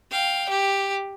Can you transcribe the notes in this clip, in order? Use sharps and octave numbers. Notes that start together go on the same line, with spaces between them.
F5 G5
G4